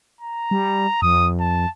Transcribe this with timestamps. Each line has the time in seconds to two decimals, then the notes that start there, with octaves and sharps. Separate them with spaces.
0.21 A#5
0.51 G3
1.02 F2 D#6
1.40 A5